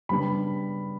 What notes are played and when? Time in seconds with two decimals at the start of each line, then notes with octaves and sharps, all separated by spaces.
0.09 C#3 G3 B3 D4 B5